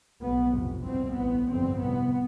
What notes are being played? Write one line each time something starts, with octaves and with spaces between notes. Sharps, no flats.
B1 B2 B3
G1 F2 C3
C2 B2 C4
A1 A2 B3
G1 F2 C3 C4
C2 C3 B3